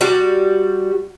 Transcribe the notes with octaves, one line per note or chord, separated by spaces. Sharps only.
G3 F#4